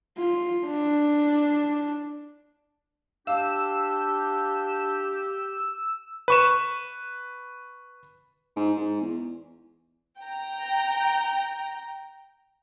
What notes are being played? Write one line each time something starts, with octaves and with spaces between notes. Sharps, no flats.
F4
D4
D4 G4 F5 E6
B4 C#6 E7
G#2
G#2
E2
G5 A#5